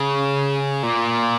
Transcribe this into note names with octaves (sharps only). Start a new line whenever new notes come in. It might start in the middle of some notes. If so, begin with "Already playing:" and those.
Already playing: C#3
A#2